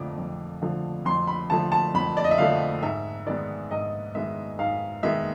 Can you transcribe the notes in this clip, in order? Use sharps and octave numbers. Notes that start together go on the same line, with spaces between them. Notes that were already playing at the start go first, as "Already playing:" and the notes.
Already playing: F2 D3 F3 A3 D6
F2
D3 F3 A3
F2 C6
B5
D3 F3 A3 A5
A5
F2 B5
D5
D#5
E5
D3 F3 A3 F5
G#2 E5
D#3 G#3 B3 D5
G#2 D#5
D#3 G#3 B3 E5
G#2 F5
D#3 G#3 B3 E5